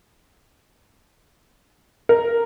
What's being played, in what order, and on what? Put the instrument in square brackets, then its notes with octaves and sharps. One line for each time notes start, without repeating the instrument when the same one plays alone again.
[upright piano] A#4